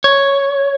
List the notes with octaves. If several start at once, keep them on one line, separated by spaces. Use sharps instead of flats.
C#5